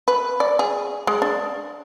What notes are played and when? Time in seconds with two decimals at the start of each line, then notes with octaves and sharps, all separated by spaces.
0.08 B4
0.40 D5
0.59 G#4
1.07 G#3
1.22 D4